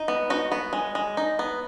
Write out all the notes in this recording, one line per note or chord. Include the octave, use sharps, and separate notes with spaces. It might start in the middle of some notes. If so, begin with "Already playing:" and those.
Already playing: D#4
B3
D#4 F#4
B3
G#3
G#3
D#4
B3